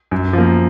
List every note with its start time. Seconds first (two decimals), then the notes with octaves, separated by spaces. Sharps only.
0.11 F#2
0.33 F3 A#3